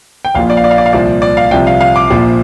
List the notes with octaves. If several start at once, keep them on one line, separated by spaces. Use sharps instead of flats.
G5
A#1 A#2 F3 F5
D5
F5
D5
F5
D5
F5
C2 A#2 F3 D5
D5
F5
C2 C3 F3 G5
F5
F5
D6
A#1 A#2 F3